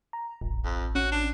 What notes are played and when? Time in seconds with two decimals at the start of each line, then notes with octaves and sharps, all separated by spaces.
0.13 A#5
0.41 D#1 A1
0.64 F2
0.95 C#4 F#4
1.12 D4